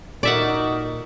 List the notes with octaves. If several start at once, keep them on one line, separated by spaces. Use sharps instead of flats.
A#2 D#4 F#4 A#4 D5 E5 F#5